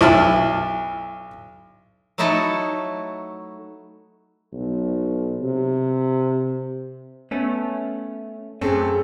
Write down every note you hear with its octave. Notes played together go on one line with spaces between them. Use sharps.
B1 E4 A5 E6 F6
F#3 A3 D#4 E4 F#4 A4
B1
C3
A3 B3 C#4
F#2 A3 C4 C#4 G#4 A4